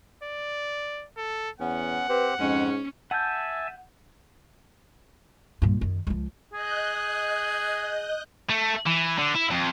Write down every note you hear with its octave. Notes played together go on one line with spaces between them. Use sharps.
D5
A4
E2 B3 C#4 F#5
C4 G4 B4 C5
F2 G#2 G#3 C#4
E5 F#5 G#5 A5 G6
G2 A#2
F#2 D#3
C#2 F3
G#4 D#5 F#6 G6
A3
E3
D3
E4
F2